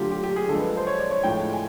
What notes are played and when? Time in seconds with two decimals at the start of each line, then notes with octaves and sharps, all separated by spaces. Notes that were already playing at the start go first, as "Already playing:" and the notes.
Already playing: D3 F#3 A3 F4 G4
0.11 G4
0.24 G4
0.36 G#4
0.48 D3 F3 G#3 A4
0.58 B4
0.77 C5
0.87 C#5
0.99 D5
1.11 C#5
1.23 A2 F3 G#3 G5
1.53 G#5